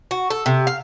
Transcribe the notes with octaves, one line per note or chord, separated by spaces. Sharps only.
F#4
A4
C3
F5